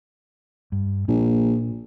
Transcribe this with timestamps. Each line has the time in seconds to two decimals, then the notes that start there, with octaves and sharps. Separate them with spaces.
0.72 G2
1.08 A#1 A#2